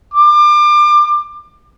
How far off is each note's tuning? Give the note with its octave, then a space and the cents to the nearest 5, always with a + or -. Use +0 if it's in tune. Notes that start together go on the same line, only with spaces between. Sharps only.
D6 +30